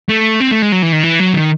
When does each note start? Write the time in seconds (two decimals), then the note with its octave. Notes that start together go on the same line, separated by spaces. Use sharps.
0.09 A3
0.40 C4
0.51 A3
0.62 G#3
0.72 F#3
0.82 E3
0.92 D#3
1.04 E3
1.20 F#3
1.34 D#3